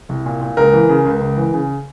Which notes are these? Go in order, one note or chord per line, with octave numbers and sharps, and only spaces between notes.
C2
A#2
A#2
C#2 A#4
E3
C#3
C#2
C#2
E3
C#3